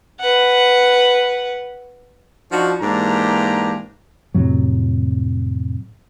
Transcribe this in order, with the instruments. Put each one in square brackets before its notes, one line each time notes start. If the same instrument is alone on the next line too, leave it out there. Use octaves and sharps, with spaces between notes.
[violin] B4 F#5
[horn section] F3 D4 D#4 F#4
G#2 E3 A#3 D4 G4 A#5
[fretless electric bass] F2 A2 C3 F#3